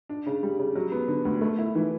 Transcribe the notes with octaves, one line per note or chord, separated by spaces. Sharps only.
D4
C#3
G3
C#3
F#3
B3
D3
D2
A3
E4
E3